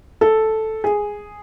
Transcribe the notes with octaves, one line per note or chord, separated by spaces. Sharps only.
A4
G#4